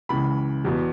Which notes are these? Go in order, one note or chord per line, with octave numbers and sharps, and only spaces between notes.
C#2 C#3 E3 B5
E2 B2